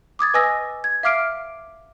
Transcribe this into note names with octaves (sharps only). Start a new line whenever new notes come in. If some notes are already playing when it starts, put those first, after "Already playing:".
D6 D#6 G#6 A6
B4 D#5 G#5 D#6 E6 A#6
G#6
E5 F5 D6 F6 C7 D7